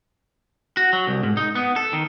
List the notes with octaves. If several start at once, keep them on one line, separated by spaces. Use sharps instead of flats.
F#4
F#3
C2
G#2
D#4
B3
A4
D#3